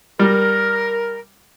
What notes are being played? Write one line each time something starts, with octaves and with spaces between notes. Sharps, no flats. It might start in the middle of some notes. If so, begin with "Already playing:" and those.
G3 A#4